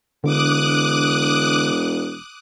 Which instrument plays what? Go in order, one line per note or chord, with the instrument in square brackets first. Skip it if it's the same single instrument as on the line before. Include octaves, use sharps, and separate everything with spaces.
[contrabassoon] E1 [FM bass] D3 [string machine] D6 D#6 F#6